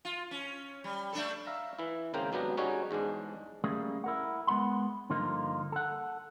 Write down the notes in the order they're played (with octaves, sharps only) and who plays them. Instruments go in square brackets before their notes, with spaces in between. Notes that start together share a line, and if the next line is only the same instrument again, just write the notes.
[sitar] F4
C#4
G3
A3 D4 A4
[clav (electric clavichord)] E5 F5 A#5
E3 E4
G#1 C#3 A#3 A#4 C5 G5
G#1 F#3 B3 D4 G4 A#5
G3 C#4 D#4 F#4 G#4 C#5
E2 G#2 G#3 D4
[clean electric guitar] G3 A3 A#3 C#4 G#4
E4 A#4 F#5
G#3 B3 F#5 B5 C6
G2 D3 F3 A#3 D#4 F4
A4 F#5